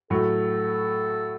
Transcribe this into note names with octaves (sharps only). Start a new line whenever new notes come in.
A2 F#3 A3 A4